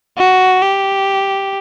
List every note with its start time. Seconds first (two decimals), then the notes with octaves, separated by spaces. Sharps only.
0.18 F#4
0.62 G4